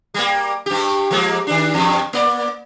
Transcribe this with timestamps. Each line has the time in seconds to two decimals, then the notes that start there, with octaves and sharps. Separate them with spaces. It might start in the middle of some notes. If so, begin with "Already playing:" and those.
0.14 G3 A#3
0.66 G2 G4
1.11 F3 G#3 A#3
1.47 D#3 D4
1.74 E2 G2
2.13 A#3 D5